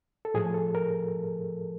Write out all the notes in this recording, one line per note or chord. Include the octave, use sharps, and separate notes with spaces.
A4
A2 F3 A3 G#4
A4
A#4